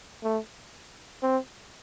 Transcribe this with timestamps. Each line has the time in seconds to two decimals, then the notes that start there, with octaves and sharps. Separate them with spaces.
0.23 A3
1.23 C4